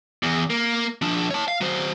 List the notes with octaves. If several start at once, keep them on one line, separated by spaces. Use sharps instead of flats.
E2
A#3
F3 D4
C#5 A5
F5
F#3 C5